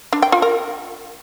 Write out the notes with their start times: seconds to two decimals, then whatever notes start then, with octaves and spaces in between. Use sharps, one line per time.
0.13 D4
0.22 G5
0.32 F4
0.42 A#4